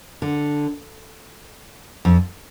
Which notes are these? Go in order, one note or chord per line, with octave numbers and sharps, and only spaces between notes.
D3
F2